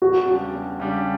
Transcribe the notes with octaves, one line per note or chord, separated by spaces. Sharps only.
E2 F#4
C#3 G3 D4
E2
C#3 G3 D4